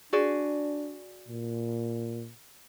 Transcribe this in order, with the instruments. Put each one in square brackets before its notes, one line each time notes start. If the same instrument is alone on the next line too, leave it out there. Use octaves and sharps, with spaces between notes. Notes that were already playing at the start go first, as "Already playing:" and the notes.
[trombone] D4 [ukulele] F#4 G#4 D5
[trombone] A#2